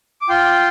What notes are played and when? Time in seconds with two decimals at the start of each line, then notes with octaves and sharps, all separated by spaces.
0.21 D6
0.29 F4 G5 C6